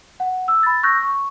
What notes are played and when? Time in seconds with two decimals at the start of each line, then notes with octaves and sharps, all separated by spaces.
0.20 F#5
0.48 E6
0.63 B5 A6
0.83 C#6 E6 F#6 G6 A#6
1.03 C#6